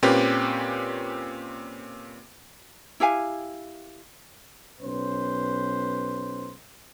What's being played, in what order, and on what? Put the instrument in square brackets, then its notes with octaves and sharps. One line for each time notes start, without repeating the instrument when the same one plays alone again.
[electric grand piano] A#2 C4 C#4 G4 B4
[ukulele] E4 G4 F5 G#5
[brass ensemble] B1 C#4 B4 C5